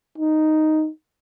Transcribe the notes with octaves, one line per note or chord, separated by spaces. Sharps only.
D#4